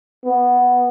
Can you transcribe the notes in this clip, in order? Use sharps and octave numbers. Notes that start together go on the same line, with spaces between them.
B3